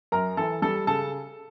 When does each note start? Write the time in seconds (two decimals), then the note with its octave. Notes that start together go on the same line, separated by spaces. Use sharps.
0.12 F#2 A#4 A#5
0.37 E3 A4 A5
0.62 G3 A4 A5
0.87 C#3 A4 A5